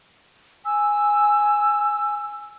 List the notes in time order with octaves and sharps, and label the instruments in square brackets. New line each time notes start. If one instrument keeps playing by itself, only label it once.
[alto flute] G#5 [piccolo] E6